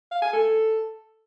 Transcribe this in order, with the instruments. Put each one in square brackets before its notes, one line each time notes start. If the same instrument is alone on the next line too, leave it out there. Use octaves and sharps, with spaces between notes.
[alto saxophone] F5
G#5
A4